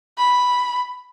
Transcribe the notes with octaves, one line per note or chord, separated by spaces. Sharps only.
B5